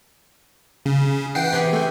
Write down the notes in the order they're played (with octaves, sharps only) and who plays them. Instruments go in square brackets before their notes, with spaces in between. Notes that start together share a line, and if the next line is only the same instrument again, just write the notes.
[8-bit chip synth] C#3
[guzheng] E3 [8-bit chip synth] F#5 G5 C7
[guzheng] C3 G4 G#4
[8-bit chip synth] A3